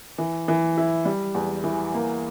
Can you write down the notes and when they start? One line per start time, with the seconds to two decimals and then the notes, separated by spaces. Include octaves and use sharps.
0.18 E3
0.48 E3
0.77 E4
1.05 G3
1.35 E2
1.64 E3
1.94 A#3